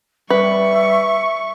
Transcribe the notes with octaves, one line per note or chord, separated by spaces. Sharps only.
G3 B4 E5 C#6